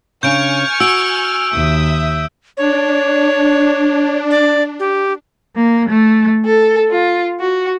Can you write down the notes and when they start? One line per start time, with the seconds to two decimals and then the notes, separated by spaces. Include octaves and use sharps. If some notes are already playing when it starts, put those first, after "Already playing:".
0.23 C#3 D4 G#5 C#6 F6 G6 D7
0.80 F#4 E6 D7
1.53 D#2 E5 D#6
2.57 D4 C#5
4.30 D5
4.79 G4
5.54 A#3
5.88 A3
6.45 A4
6.91 F4
7.40 F#4